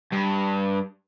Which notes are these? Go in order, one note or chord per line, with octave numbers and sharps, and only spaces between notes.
G2